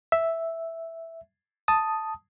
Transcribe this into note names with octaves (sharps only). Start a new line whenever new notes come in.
E5
A5 D#6